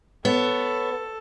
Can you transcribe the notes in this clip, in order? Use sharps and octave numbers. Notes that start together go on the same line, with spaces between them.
B3 A4 C#5